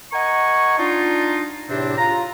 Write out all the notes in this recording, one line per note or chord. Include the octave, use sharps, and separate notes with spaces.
A#4 D#5 F#5 G#5 C#6
D4 D#4 F4
E2 A2 C3 C4 D4
F4 A#5